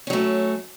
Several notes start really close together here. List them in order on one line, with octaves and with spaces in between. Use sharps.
C#4 F#3 A3